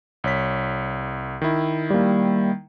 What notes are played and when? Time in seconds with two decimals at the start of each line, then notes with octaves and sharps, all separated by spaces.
0.24 C2 C#5 B6
1.42 D#3 E4
1.90 G3 A#3